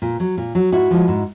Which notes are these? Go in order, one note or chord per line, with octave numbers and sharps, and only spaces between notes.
A#2
F#3
A#2
F#3
G#2 E4 F#4
F3 G#3
G#2